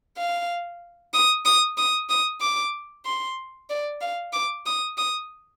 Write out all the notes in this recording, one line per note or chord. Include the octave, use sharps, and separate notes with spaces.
F5
D#6
D#6
D#6
D#6
D6
C6
D5
F5
D6
D#6
D#6